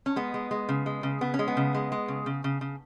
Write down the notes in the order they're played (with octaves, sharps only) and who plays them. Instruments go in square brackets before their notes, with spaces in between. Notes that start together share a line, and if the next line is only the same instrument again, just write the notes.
[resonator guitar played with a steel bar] C#4
G#3 B3
G#3
G#3
C#3
G#3
C#3
C#3 B3
C#4
G#3
B3
C#3
G#3
G#3
C#3
C#3
C#3
C#3